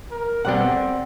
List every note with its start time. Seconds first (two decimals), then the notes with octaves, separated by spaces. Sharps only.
0.11 A#4
0.45 B2 G3 B3 C4 D5 F#5